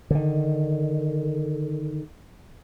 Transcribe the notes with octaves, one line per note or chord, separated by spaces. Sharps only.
D3 D#3